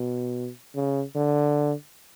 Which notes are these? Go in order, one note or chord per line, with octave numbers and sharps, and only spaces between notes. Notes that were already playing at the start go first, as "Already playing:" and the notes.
Already playing: B2
C#3
D3